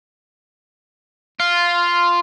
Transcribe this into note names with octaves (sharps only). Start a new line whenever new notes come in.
F4